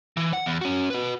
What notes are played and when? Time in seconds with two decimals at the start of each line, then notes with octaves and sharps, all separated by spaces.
0.17 E3
0.33 F#5
0.46 E2
0.61 C#4 F#4
0.90 F#4 B4